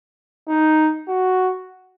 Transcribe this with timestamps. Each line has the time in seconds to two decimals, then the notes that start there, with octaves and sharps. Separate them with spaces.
0.49 D#4
1.09 F#4